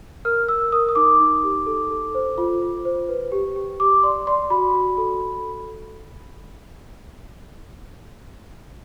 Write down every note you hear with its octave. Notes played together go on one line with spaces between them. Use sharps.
A#4 F6
A#4 E6
A#4 D#6
D#6
D#4 D6
D#4
G4
A4
A4
C5
F4
F4
C5
B4
G4
G4
G4 D6
D5 C6
D5 C6
F#4 B5
F#4
A4